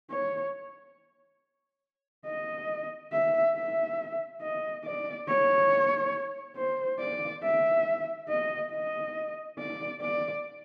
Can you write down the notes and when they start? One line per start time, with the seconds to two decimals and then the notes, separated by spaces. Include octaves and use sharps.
0.10 C#5
2.26 D#5
3.12 E5
3.56 E5
4.42 D#5
4.84 D5
5.27 C#5
6.56 C5
6.99 D5
7.43 E5
8.29 D#5
8.72 D#5
9.59 D5
10.01 D5